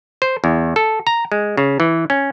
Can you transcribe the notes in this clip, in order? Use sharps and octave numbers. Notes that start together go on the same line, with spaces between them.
C5
E2
A4
A#5
G#3
C#3
E3
C#4